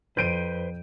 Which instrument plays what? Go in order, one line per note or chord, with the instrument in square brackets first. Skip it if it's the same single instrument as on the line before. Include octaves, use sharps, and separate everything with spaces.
[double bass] F2 [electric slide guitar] B4 C5 [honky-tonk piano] G6 D7 D#7